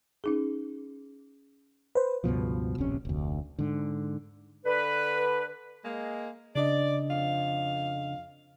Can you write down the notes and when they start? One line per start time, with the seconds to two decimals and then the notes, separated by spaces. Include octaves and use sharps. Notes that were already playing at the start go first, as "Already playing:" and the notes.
0.24 C#4 D#4 G#4
1.95 B4 C5
2.24 C#2 G2 B2 F3
2.78 D1 A#1 C3 C#4
3.05 F1 D2
3.59 G#2 D3
4.65 D3 B4
5.85 G#3 A#3
6.56 C#3 D4 D5 D#5
7.11 F2 F5